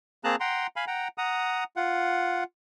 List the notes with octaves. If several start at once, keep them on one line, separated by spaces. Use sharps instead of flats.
A#3 C4 G#4 A5 A#5 F#6
F#5 G5 A#5 C6
F5 G#5 B5
F#5 G5 A#5
F#5 A#5 D#6
F4 F#5